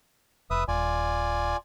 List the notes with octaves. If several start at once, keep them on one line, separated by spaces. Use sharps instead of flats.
F1 B4 E5 D#6
D#1 F4 D5 G#5